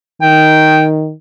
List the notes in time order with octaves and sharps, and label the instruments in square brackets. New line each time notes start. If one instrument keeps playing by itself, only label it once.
[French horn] D#3 [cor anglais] G5